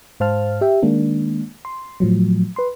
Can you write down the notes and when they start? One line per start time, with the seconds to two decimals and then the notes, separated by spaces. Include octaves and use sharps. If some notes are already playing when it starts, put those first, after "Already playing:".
0.20 G#2 C5 F5 A5 F6
0.61 G4 E5 G5
0.83 D#3 G#3 A#3 D4
1.65 C6
2.00 A2 F3 F#3
2.56 B4 C6